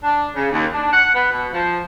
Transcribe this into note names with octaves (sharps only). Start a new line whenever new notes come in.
D4
C#3
D#2
D4
F#5
B3
B2
F3